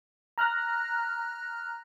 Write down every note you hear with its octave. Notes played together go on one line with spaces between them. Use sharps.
A#5 F6 F#6 A#6